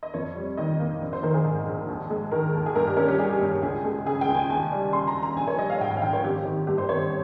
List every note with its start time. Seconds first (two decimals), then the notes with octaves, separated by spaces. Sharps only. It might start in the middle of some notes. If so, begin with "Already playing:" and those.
0.03 D#5
0.14 F2 C#5
0.36 G3
0.57 D#3 D#5
0.80 A#3
1.01 A#1
1.13 C5
1.23 D#3 A#4
1.34 G#4
1.44 G#2
1.67 A#1
1.88 D#2
2.10 G#3
2.31 D#3 A#4
2.54 D#2
2.66 G#4
2.75 G2 A#4
2.87 G4
2.97 C#4 A#4
3.08 G4
3.19 G3 G#4
3.41 G2
3.63 C#2 G#4
3.84 G#3
4.06 C#3 G#4
4.21 G5
4.29 C#2
4.35 G#5
4.50 D#2 G#5
4.72 G3
4.93 C#3 C6
5.08 A#5
5.15 D#2
5.23 A#5
5.37 A#1 G#5
5.47 C#5
5.58 G3 D#5
5.70 F5
5.80 G#2 G5
5.91 G5
5.97 F5
6.02 A#1 G5
6.13 C#5
6.24 G#1 G4
6.45 D#3
6.67 G2 G4
6.78 C5
6.89 G#1 C#5